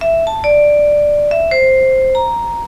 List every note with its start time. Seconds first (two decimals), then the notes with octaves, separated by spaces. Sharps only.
0.01 E5
0.27 A5
0.44 D5
1.31 E5
1.51 C5
2.15 A#5